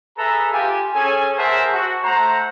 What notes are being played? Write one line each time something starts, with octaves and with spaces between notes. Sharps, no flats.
G#4 A4 B4 E5 A#5
F4 G4 G#5
C#4 G#4 A4 G#5
G#4 A#4 C5 E5 F#5 A5
F#4
A3 C5 F#5 A#5